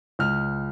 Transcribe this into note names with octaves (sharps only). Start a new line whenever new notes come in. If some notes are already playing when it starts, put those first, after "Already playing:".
C#2 F6